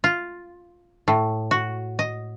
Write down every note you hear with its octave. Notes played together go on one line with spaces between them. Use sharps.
F4
A2
F#4
D#5